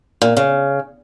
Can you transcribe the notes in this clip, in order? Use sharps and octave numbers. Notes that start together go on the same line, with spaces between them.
A#2
C#3